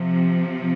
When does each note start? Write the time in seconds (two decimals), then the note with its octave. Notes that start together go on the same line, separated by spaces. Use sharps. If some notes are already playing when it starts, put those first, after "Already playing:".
Already playing: C3 F3